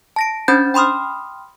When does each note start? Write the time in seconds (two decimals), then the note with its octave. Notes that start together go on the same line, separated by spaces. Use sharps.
0.16 A5 A#6 D7
0.48 C#4 D4 C5 B5 G6 A6
0.74 G5 B5 C6 D#6 F6